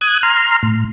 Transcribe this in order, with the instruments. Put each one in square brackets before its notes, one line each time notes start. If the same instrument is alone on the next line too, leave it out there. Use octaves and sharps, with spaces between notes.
[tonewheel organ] D#6 F#6 G#6
A#5 C6 F6
A2